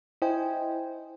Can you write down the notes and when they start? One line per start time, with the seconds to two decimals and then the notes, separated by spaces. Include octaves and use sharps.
0.22 E4 C5 D#5 G5 G#5